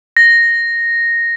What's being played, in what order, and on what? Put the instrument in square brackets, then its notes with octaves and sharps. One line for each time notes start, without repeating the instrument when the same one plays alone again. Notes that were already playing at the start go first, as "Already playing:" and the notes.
[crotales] A#6